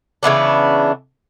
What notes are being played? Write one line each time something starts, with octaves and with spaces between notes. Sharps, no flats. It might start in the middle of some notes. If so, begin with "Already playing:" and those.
C#3 E3 B3 D4